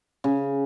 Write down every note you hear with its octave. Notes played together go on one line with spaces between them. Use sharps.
C#3